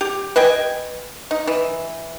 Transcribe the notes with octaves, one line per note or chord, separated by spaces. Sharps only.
G4
B4 D#5 G5 G#5
D#4
E3